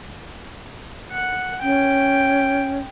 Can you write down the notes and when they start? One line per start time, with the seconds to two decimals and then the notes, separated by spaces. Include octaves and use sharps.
1.12 F#5
1.62 C#4 G5